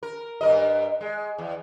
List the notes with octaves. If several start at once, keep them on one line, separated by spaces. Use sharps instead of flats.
A#4
G2 A#4 D#5
G#3
E2